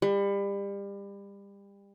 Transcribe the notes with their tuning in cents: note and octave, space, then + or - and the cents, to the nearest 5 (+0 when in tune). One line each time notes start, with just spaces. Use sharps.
G3 +30